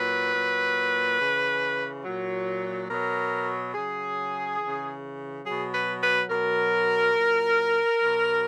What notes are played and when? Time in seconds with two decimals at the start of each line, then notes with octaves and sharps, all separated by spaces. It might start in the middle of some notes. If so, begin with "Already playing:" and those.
Already playing: A#2 F#3 B4
0.34 A#2 F#3
1.19 C#3 E3
2.04 A#2 F#3
2.90 B2 F#3 A#4
3.74 C#3 F#3 G#4
4.60 C#3 E3
5.44 B2 F#3 G#4
5.72 B4
6.01 B4
6.29 B2 F#3 A#4
7.14 A#2 F#3
8.00 B2 F#3